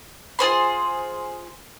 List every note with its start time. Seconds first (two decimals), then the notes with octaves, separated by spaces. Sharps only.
0.39 F4 G#4 C5 C6